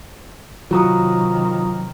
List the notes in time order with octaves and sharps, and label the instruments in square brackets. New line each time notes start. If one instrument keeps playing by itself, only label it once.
[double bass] C3 D#3 [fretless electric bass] F#3 [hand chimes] F4 A#5 D#6